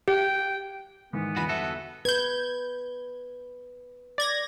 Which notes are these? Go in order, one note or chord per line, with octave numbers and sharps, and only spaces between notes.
G4 G5
G#2 D#3 E3 B3
G1 E2 E3 F#4 B5
F#4 A4 E5
B4 G6 G#6
D5 G#6 A#6